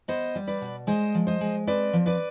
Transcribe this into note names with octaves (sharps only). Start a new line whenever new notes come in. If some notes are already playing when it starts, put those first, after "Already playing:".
B3 C5 D#5
G3
B4 D5
B2
G#3 C5 D#5
F3
C5 D#5
G#3
C4 B4 D5
F3
B4 D5